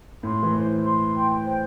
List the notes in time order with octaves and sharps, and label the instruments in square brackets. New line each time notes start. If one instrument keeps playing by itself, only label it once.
[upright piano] A2 [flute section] C6
[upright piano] E3
[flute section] C5
C6
G5
C5